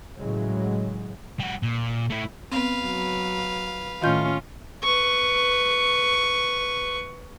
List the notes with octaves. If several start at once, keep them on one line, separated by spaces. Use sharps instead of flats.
A2 C#3 E3 F#3 G#3
G3 F#4
A#2
A3 E4
B3 C4 B4 F5
F#3
A2 D#3 C#4 F4 D#5 G6
B4 C#6